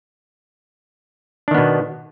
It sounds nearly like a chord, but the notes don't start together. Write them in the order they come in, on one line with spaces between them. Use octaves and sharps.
D4 D#3 B3 B2